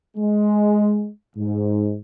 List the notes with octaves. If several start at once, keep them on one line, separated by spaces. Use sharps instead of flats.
G#3
G#2